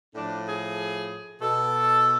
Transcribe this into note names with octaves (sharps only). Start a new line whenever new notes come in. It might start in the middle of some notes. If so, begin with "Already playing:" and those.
A2 F3 D4
G#4
B2 A4